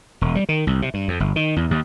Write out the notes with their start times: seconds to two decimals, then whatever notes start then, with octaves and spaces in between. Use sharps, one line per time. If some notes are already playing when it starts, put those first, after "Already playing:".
0.21 E1
0.35 G3
0.49 D#3
0.67 C2
0.82 C3
0.94 G2
1.08 F2
1.20 G1
1.36 D#3
1.56 E2
1.71 D#2